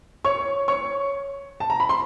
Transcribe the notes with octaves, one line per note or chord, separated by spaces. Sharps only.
C#5 C#6
C#5 C#6
A5
A#5
B5
C6